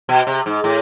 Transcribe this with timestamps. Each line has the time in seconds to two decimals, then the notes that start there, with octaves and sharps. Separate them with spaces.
0.09 B2
0.27 C3
0.46 G#2
0.64 A2